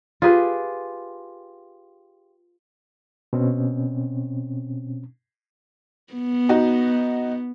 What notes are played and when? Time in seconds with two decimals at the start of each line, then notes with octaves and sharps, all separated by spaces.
0.22 F4 G4 G#4 B4
3.33 B2 C4 C#4
6.13 B3
6.49 D#4 F#4